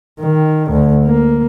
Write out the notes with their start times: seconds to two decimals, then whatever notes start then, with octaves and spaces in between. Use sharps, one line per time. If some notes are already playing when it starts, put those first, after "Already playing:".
0.20 D#3
0.72 D2
1.06 A#3